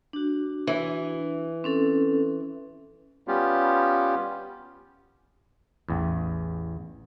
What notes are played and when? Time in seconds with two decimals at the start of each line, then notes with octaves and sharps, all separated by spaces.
0.13 D4 F#4
0.67 E3
1.64 C4 C#4 A4
3.28 G3 B3 C#4 F4 G4
5.89 A1 E2